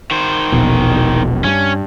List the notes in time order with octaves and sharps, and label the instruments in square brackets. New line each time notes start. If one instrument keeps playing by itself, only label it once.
[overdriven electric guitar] D#3 C5
[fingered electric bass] E1 A#1 B2
[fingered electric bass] G2 [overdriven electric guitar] C#4